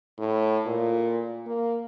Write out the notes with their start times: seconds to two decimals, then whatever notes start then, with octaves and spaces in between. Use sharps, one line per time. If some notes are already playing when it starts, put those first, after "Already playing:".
0.19 A2
0.66 A#2
1.47 A#3